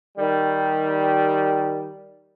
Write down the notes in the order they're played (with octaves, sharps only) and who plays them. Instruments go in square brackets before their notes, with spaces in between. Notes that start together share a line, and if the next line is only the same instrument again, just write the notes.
[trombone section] D#3 G3